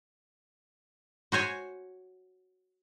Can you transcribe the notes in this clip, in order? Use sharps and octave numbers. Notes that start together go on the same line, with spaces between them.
F#4 C5 C#5 G#5